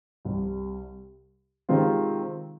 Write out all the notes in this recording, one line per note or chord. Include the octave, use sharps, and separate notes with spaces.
C2 C3 G3
C3 D#3 G#3 C4 F4